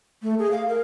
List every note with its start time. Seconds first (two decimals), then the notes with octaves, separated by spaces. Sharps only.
0.23 A3
0.39 G#4
0.51 F5
0.68 A#4